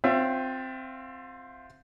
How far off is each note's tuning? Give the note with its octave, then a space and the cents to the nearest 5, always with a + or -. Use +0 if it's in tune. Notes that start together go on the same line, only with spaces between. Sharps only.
C4 +0 F4 +30 E5 +30